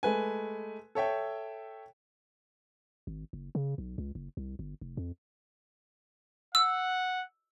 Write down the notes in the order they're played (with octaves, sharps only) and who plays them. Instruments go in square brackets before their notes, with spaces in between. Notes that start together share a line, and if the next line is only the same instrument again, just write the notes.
[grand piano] G#3 A3 B4 G#5
A4 C#5 E5 G5
[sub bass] G#1
F#1
C#3
B1
C#2
F#1
C2
G1
F1
F2
[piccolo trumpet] F#5 [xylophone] E6